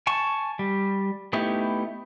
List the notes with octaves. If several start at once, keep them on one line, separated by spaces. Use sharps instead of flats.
G#5 A5 C#6
G3
A3 B3 D#4 E4 G4